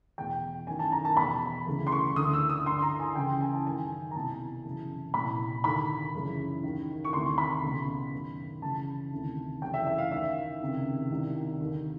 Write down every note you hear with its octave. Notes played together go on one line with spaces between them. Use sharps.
E2 B2 G5
F#2 D#3 G#5
A5
A#5
A5
E2 B2 B5
D2 C#3 E3
C6
C#6
D2 D3 D#6
E6
D#6
G2 D3 C6
A#5
G#5
C#2 C#3 E3 G5
G#5
A5
F#2 D#3 G#5
A#5
C2 B2 A5
F#2 C#3 E3
C2 A#2 B5
D#2 D3 B5
F#2 C#3 E3
D#2 D#3
C#6
D2 C3 D#3 C6
B5
C#2 B2
F#2 D#3
C#2 C#3 E3 A5
D2 C3 D#3
F#2 C#3 E3 G5
E5
E5
F5
D#2 D#3 E5
C#2 C3 D#3
C2 C3 D#3
D#2 D3